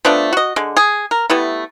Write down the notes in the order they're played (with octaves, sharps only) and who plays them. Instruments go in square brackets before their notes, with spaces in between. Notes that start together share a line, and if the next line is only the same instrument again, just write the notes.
[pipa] F3 A3 B3 D4
F#4 D#5
D3 G#3
G#4
A#4
G3 A3 B3 E4